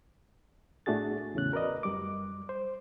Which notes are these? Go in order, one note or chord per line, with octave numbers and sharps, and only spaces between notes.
A2 A3 D4 F#4 G#4 A6
E2 A2 C#3 C#4 F#6
F#4 A#4 B4 D5 D#5
F#2 G3 D6
C5